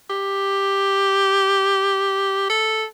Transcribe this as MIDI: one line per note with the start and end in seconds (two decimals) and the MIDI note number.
0.10 2.49 67
2.50 2.85 69